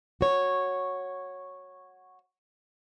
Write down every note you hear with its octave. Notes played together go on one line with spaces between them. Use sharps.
F#4 C#5